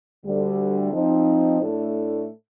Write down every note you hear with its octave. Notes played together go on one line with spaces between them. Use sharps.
D2 D3 G3
F3 C4 D#4
A2 A3 D4 A4